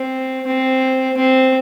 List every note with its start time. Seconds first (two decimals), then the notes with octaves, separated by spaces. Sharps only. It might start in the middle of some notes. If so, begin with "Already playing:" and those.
Already playing: C4
0.46 C4
1.16 C4